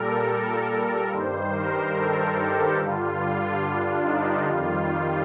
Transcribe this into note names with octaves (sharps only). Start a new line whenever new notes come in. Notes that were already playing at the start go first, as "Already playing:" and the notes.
Already playing: A#2 G3 A4 A#4
A#4
G2 D#3 G3 C5
A#4
A4
G4
G2 D3 G3 F4
D4
D#4
F2 D#3 G3 F4
F4